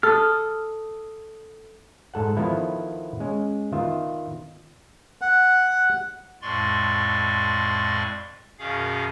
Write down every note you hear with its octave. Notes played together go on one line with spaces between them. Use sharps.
A4 D#6 F6
G#2 A4 F#5
D#3 F3 B3 E4 A4
G#3 C#4
D#3 B3 F4 E5
F#5
F2 A2 G#3 D5 C6 C#6
F#2 B2 D#3 C#4 G#4 F5